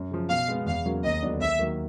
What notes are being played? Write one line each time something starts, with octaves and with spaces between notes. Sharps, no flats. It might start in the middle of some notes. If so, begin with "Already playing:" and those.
Already playing: F#2
C#3 F3
B2 F5
G#3 B3
E2 F5
C#3 F#3 A#3
D#2 D#5
D3 F#3 B3 D4
D#2 E5
D#3 F#3 A#3